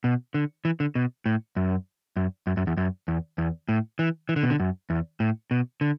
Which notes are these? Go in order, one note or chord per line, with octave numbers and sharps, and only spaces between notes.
B2
D3
E3
D3
B2
A2
F#2
F#2
F#2
F#2
E2
F#2
E2
E2
A2
E3
E3
D3
B2
D3
F#2
E2
A2
B2
D3